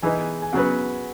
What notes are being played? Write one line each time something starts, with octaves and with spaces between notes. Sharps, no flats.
E3 B3 D#4 G#4 G#5
G#5
C#3 F#3 B3 F#4 F#5